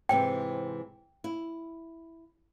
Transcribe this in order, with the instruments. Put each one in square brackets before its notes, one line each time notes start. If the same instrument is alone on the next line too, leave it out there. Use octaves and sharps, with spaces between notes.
[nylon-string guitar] G#2 C3 E3 [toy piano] G5
[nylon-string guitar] E4